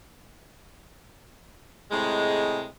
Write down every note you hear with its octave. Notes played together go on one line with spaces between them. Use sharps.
A2 C3 G#3